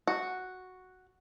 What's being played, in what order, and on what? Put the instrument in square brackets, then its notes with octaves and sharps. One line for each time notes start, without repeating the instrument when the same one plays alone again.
[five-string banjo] F#4